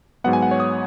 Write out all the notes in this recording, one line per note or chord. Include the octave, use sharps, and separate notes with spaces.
G#2 F#3 B3 F#5
G#5
F#5
C#5
D#6